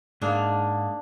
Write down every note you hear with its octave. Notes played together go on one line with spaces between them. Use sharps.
G#2 A#3 D4 G#4 F5